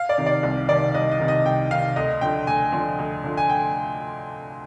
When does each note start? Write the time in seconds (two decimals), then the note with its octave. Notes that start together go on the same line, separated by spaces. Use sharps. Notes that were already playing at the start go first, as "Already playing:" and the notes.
Already playing: F5
0.09 D5
0.18 C3 D#3
0.26 D5
0.43 C2
0.69 C3 D#3 D5
0.94 C2 D#5
1.11 D#5
1.20 C3 D#3
1.28 D#5
1.45 C2 G5
1.71 C3 D#3 F5
1.96 D2 D#5
2.21 D3 F3 G5
2.47 D2 G#5
2.72 D3 F3
2.99 D2
3.24 D3 F3
3.37 G#5
3.49 G5